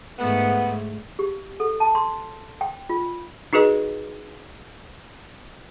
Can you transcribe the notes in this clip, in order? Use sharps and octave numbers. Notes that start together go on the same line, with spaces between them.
G#2 A3 B3
G4
A4
A5
C6
G5
F4
D#4 F#4 G#4 B4 D#5